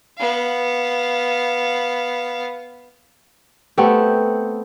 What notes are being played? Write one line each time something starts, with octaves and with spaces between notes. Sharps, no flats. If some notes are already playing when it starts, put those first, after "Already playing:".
B3 F5
A3 B3 C4 G4